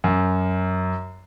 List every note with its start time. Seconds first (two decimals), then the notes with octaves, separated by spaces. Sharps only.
0.04 F#2